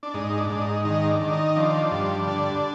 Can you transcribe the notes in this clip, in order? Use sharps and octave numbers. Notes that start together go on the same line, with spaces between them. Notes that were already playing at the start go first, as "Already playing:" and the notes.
D4
G#2 D#4
D4
G#2
D#4
D#3 D#4
D4
D#3
D#4
F3 D4
G2
D3